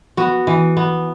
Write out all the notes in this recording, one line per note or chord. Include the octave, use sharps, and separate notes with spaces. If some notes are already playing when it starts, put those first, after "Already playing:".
B3 F#4
E3
B3